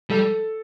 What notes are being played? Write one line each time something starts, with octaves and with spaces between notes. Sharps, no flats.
G3 A4